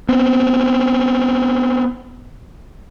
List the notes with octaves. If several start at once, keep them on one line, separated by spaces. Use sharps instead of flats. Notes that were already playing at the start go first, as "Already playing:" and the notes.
B3 C4